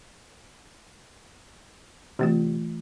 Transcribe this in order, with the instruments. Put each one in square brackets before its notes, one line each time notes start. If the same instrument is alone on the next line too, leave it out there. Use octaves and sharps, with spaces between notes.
[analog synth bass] C3 [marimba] E3 A3 F4